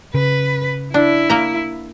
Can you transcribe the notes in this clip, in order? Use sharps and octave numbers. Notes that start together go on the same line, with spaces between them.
C#3 B4
D4 E4
A#3 A#5